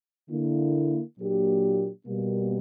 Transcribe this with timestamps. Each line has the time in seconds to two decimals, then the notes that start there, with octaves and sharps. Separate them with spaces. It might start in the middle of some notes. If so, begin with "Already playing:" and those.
0.30 D3 A#3 E4
1.18 A#2 F#3 A#3 D4 G4
2.06 B2 G3 A#3